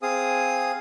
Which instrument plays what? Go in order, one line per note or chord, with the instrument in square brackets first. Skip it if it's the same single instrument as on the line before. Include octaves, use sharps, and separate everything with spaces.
[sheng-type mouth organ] C4 G#4 F5 D#6